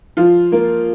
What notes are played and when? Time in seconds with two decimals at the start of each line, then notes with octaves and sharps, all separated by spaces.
0.17 F3 F4
0.52 A#3